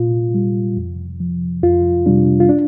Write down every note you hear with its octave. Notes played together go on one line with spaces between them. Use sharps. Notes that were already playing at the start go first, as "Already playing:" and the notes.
Already playing: A#2 F4
G3
F2
F3
F2 F4
C3 G3 D4
F4
D4